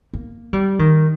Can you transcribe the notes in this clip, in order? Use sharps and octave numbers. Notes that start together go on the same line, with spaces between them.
A#3
G3
D#3